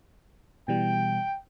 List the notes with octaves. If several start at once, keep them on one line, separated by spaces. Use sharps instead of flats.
B2 E3 G3 G5